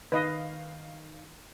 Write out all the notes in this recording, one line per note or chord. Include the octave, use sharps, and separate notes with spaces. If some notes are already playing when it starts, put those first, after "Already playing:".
D#3 B4 D#5 F5